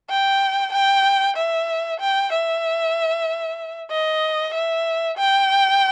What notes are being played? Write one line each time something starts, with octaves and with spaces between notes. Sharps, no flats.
G5
G5
E5
G5
E5
D#5
E5
G5